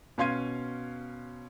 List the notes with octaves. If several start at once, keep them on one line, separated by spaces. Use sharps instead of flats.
B2 C#4 F5 C6 G#6 D#7